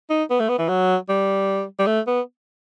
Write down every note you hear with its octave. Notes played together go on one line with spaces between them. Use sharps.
D#4
B3
A3
B3
E3
F#3
G3
G3
A3
B3